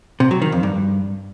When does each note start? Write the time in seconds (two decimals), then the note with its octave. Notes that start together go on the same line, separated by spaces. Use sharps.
0.20 C3
0.31 F#3
0.42 D#3
0.52 F2
0.63 G2